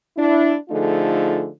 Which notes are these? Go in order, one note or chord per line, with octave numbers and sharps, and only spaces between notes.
D4 E4
D3 F3 A3 D#4 F4 G#4